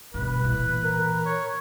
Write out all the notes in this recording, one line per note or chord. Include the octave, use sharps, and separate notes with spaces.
G2 B2 B4
A#2 E3
A#4
C#5